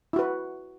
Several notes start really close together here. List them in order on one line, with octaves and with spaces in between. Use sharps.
E4 F#4 B4